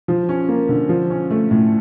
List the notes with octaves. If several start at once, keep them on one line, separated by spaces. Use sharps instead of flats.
F3
C#4
A#3
D3
F3
C#4
A3
A2